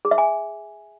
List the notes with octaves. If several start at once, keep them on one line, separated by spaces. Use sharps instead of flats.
G#4
E5
G#5